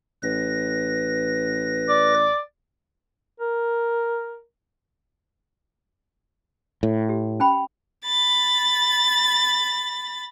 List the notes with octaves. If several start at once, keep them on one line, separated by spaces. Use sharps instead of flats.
A1 B4 A#6
D5
A#4
A2
G4
C#4 G5 B5
B5 A6